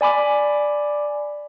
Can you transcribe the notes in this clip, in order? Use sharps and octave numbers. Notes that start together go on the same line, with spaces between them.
D5 G#5 B5 D6